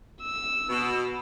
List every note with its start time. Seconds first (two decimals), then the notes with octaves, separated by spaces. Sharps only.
0.22 E6
0.69 B2